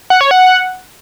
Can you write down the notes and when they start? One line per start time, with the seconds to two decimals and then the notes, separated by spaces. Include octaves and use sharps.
0.10 F#5
0.21 C#5
0.31 F#5